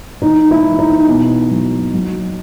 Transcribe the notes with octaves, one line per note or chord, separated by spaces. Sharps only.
E3 D#4
E4
E3
D#4
B2
F#3
F#3